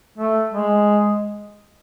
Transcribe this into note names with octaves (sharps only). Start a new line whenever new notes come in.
A3
G#3